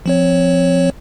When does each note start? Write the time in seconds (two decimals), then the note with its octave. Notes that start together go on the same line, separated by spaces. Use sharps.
0.06 F3 C4 C#5